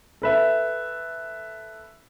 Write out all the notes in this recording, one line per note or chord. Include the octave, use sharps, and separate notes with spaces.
A4 B4 E5